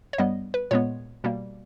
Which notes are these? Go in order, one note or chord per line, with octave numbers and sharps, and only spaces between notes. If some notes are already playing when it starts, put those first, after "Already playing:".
C#5
G2 G3 B3 D#5
B4
A#2 G#3 B3 C#5
B2 G3 A#3